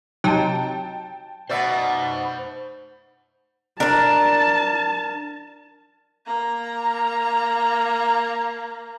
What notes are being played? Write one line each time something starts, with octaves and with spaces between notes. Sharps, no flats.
C3 F#3 D#4 G5 A5
B2 C5 D5 E5 F#5
D4 A#4 D5 A5
A#3 A#5